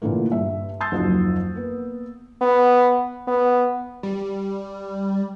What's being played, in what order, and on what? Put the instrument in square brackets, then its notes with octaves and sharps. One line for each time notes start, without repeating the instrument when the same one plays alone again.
[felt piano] A#2 D3 E3 A3 A#3
G2 E5
C6 D#6 E6 G6 A6 C7
F#1 D#2 F3 F#3 F#4
A#3 B3
[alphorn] B3
B3
[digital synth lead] G3